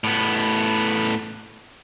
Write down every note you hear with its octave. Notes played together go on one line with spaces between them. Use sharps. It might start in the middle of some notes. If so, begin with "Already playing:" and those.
A2 B3